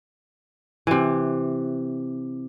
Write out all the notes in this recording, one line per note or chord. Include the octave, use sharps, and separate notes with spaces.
C3 E3